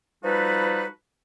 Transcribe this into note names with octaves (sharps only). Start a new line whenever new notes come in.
F3 G3 D#4 F#4 A4 B4